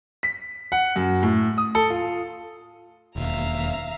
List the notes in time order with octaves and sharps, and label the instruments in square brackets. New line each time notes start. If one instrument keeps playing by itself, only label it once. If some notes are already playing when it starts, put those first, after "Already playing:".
[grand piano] B6
F#5
F#2
A2
D#6
A4
F4
[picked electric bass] E1 D#2 [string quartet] E5 F5 A#5